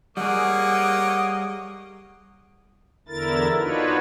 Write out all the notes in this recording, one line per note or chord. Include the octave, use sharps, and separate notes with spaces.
G3 A#3 G#4 C#5 D#5 F#5 D6
E2 D3 E4 A#4 A6
D4 D#4 F4 F#4 B4 C#5